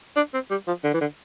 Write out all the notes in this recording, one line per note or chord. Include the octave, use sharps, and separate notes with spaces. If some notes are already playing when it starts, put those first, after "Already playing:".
D4
C4
G3
F3
D3
E3
D3